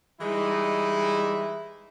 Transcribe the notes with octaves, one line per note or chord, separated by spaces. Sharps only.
E3 G3 G#3 D#4 E4